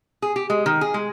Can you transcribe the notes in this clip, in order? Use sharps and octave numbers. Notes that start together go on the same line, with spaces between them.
G#4
G4
G#3
D#3
G#4
G#3